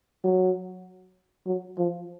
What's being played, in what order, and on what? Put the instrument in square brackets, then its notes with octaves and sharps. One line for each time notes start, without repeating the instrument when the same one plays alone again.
[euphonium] F#3
F#3
F3